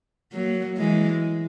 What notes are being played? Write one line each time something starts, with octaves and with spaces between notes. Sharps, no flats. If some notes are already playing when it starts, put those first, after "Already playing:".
F#3 A#3
E3 G#3